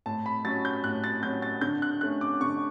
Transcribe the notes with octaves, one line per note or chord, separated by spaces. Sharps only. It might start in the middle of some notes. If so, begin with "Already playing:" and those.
A2 A5
B5
F#3 C#4 A6
G6
A2 F#6
A6
F#3 C#4 G6
A6
D3 G6
F#6
A3 C#4 F#6
D6
D3 C#6